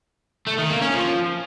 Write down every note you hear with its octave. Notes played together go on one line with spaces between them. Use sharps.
A3
D#3
A#3
C#4
F3